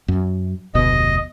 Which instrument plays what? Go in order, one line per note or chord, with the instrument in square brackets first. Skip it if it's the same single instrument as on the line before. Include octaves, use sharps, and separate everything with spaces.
[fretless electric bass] F#2
[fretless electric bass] F1 D2 B2 [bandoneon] D#5